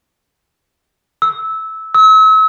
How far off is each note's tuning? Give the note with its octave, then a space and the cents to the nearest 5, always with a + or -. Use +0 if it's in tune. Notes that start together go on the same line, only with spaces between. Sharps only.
E6 -15
E6 -40